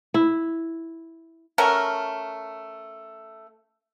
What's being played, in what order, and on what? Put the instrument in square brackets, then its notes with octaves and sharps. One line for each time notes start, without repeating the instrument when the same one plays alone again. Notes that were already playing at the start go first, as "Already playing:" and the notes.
[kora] E4
[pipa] A3 C#4 A#4 F#5